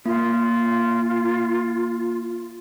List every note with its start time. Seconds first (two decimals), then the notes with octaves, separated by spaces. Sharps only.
0.06 A#3 F4